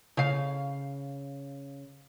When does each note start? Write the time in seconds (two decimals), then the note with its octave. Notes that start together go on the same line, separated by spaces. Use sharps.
0.17 C#3 F5